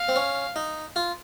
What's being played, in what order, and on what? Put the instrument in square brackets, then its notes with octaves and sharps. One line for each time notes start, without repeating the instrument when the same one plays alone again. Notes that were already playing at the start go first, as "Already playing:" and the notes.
Already playing: [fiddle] F5
[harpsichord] C4
C#4
D#4
F4